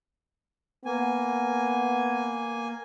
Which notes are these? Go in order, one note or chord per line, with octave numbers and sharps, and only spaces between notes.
A#3 B3 G#5